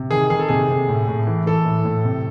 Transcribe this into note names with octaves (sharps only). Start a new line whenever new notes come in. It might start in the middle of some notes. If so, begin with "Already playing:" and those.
Already playing: C3
D#3 G#4
D#3 G#4
A4
C3 G#4
C3
A2
A2
E3
E3 A4
A2
A2
C3